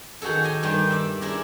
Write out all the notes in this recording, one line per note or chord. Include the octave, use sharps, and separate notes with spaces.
D#3 D#4 F#4 G#4 A4
G4 D#5 G#5
G2 D#3 G3
D5 E5
D4 E4 G#4 A#4